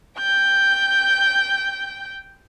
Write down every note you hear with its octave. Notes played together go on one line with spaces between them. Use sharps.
G5 G6